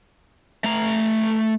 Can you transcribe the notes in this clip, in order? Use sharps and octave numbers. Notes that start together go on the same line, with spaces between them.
A3 A#5